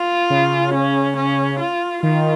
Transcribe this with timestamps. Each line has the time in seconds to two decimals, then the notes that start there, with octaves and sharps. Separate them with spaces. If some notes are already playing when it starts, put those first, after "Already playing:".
Already playing: F4
0.30 C#3
0.74 C#4
1.16 C#4
1.60 F4
2.03 D#3 F4